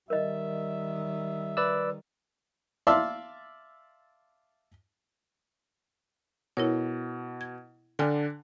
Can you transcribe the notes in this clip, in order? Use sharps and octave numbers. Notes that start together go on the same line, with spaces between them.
D#3 G3 A#4 D#5 E5
B4 D5 E6
D5 E5 F5 A5 C6 E6
B2 E4 A#4 C#5
G#6
D3 D4 G5 G#5 F6